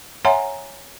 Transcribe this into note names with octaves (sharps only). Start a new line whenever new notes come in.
C#5 E5 F#5 G#5 A#5 C6